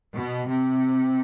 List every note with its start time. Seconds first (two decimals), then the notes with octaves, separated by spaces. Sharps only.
0.14 B2
0.48 C3